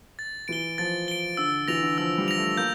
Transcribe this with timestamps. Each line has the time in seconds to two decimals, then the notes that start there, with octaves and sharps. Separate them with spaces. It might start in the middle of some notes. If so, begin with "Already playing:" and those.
0.19 A6
0.48 E3 D7 G7
0.78 F3 A6
1.08 D7 G7
1.37 D3 E6
1.68 E3 A#6 F7
1.83 D3
1.98 F3 E6
2.18 G3
2.28 A#6 F7
2.38 A3
2.57 A#3 G6